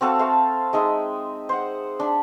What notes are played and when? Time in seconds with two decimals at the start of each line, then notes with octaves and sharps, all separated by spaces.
0.01 C4 F#4 A4 F5
0.19 A3 C5 F5
0.73 G#3 D#4 E5 C6
1.49 C5 F#5
2.00 D4 B5